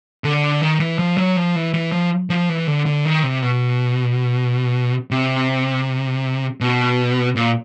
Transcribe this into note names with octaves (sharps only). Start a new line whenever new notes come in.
D3
D#3
E3
F3
F#3
F3
E3
E3
F3
F3
E3
D3
D3
D#3
C3
B2
C3
B2
A#2